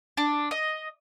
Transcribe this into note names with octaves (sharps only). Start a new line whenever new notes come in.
D4
D#5